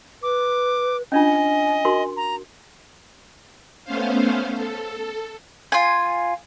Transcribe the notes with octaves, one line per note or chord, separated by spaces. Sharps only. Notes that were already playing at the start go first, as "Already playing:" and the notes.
B4 D6
C#4 D4 F4 D#5 G#5
F#4 A#4 C6
A#5
A3 B3 C#4 C5 F5
A4
F4 G#5